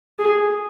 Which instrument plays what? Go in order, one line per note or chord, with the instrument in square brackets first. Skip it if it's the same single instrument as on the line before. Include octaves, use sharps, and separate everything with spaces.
[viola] G#4